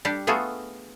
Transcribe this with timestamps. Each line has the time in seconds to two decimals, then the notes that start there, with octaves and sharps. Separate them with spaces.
0.05 G3 D4 G4 D5
0.27 A3 B3 F4 F#4 G#4 A4